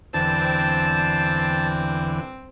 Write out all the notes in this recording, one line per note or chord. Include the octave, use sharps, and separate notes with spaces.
E2 G2 D3 C4 A5